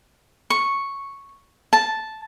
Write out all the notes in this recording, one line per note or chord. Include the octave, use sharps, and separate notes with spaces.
C#6
A5